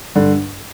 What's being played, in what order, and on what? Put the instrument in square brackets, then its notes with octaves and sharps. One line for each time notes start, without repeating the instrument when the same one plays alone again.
[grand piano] G2 [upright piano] D3